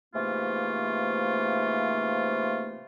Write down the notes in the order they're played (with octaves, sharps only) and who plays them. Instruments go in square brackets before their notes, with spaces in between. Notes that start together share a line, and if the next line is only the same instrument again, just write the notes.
[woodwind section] G#2 C3 E3 A3 A#3 F4